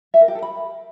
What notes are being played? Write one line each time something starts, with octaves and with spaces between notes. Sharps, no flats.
E5
A#4
G4
A4
B5